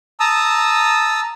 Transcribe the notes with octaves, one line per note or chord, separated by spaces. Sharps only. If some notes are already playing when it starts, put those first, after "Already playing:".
A5 A#5 D#6 E6